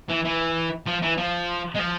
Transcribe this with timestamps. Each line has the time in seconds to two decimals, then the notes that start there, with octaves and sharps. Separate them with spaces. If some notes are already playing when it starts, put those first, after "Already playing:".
0.09 E3
0.25 E3
0.86 F3
1.02 E3
1.17 F3
1.75 G#3
1.79 F3